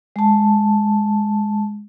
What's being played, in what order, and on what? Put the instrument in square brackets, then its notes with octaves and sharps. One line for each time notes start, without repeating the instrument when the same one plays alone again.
[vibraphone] G#3 A5